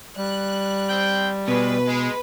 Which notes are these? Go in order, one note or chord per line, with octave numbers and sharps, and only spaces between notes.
G3 F#6
C4 G5
B2 G#3 B4
G#3